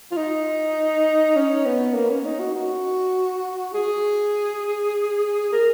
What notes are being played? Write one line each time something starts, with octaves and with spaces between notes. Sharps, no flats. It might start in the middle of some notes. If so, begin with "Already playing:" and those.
F4
D#4
C#4
B3
A#3
C#4
D#4
F#4
F#4
G#4
A#4